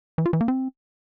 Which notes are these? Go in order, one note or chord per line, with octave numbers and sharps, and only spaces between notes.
E3
F4
E3
A#3
C4